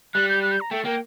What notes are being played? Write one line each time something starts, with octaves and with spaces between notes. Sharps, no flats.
G3 F#6
G6
F#6
G6
A#5
A3 G5
A#3 G5